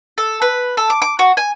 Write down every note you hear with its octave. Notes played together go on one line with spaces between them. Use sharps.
A4
B4
A4
D6
D6
F#4
G#5